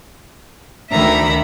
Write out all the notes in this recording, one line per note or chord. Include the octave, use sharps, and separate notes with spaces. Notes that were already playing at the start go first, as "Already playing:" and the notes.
D2 D#3 E5 A#5 B5